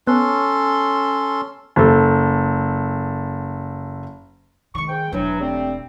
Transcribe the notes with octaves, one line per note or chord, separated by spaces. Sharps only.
B3 C#4 A4 C6
F#1 A4
D#3 G#3 C#6
G#2 G5
E1 E3 F#3 D4
G3 A3 C4